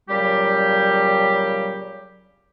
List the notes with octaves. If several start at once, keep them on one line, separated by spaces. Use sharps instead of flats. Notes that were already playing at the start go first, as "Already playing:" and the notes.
A#2 C#3 F#3 G3 G4